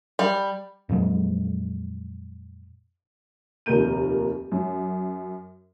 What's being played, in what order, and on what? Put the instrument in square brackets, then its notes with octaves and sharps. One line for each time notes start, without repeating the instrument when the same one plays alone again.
[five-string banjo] G3
[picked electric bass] F2 A#2 F#3 G#3
[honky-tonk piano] F1 D#2 A#2 A#4 G6 D#7
F#2